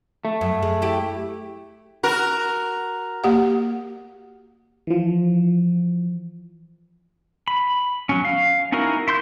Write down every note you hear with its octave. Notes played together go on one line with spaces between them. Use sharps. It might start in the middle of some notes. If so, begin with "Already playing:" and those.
A3
F#2
G#3
E4 G4
F#4 A#4
A#3 G4 F#5
E3 F3
B5
F#3 C#4
F5
C#4 D#4 E4 F#4 A#4
E4 C6 G6